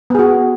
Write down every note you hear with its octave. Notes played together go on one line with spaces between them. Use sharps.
B3 F#4 G#4